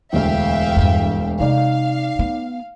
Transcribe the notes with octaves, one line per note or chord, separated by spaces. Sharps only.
E1 D2 E5 F5 G5
E2 G2
C3 D#4 D5 F5
B3